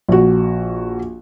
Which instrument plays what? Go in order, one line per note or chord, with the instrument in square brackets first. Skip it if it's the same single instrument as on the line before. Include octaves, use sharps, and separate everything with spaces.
[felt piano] A#1 F#4